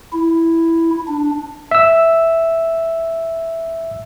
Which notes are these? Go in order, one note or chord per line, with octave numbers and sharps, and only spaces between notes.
E4
D4
E5 E6